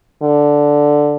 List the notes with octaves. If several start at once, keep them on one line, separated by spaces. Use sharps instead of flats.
D3